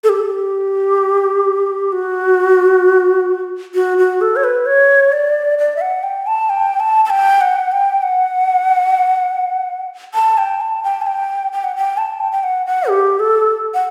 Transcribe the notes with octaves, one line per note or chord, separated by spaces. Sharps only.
A4
G4
F#4
F#4
F#4
A4
C#5
B4
C#5
D5
D5
E5
F#5
G5
A5
G5
A5
A5
G5
F#5
G5
F#5
A5
G5
A5
G5
A5
G5
G5
F#5
G5
A5
G5
G5
F#5
F#5
G4
A4
F#5